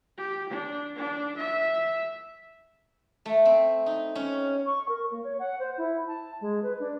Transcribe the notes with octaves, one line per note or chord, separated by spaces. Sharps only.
G4
D4
D4
E5
A3
C4
D#4
C#4
C#6
A#4
A#3
C#5
F#5
C5
E4
A5
G#3
B4
D4